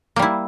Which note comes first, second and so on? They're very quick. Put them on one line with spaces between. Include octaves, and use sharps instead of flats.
A#3 G3 E4